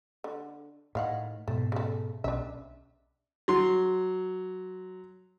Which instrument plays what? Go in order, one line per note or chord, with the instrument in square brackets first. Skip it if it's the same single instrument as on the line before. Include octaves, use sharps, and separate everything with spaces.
[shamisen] D3
[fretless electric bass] A2 [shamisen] D#3 F5 F#5
[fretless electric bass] G#2 B2 [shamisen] A3
[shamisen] C#3 A3
[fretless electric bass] B1 C#4 [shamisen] D4 E5
[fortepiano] F#3 C6